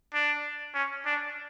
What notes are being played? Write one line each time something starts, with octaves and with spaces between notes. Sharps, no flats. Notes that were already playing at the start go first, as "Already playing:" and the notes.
D4
C#4
D4